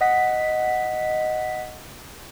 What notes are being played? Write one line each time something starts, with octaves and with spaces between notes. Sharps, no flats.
D#5 F#5 B6